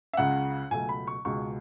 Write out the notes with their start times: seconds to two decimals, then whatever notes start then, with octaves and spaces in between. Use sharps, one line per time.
0.13 E5
0.17 C#2 C#3 G#3 F#5
0.71 C#2 B2 F#3 A3 G#5
0.89 B5
1.07 C#6
1.25 C#2 B2 G#3 C#6